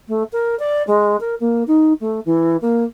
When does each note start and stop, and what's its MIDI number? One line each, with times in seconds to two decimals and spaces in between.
0.08 0.23 57
0.32 0.57 70
0.59 0.82 74
0.87 1.16 56
1.20 1.35 70
1.40 1.63 58
1.67 1.93 63
2.00 2.20 57
2.25 2.57 52
2.61 2.84 58